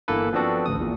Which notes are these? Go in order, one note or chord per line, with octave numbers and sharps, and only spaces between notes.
G1 D3 E3 A#3 A4 B4
F3 B3 C4 D4 F#4 A4
A1 D2 D#6
E2 A#2